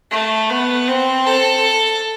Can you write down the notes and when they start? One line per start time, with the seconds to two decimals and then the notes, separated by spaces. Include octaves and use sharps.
0.11 A3
0.50 B3
0.88 C4
1.26 A4